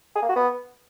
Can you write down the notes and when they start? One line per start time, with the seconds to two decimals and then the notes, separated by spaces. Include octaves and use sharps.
0.16 G#4
0.22 A#3
0.29 F#4
0.36 B3